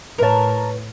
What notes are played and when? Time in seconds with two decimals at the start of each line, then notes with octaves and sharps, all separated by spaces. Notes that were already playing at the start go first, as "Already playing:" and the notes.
0.18 A2 A#4 B4 C#5 A5